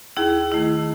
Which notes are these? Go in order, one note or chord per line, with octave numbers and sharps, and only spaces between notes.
D#2 E4 G#4
D#3 A3 E4